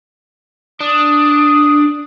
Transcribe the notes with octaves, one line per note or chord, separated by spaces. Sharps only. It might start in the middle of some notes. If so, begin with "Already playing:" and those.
D4 D#6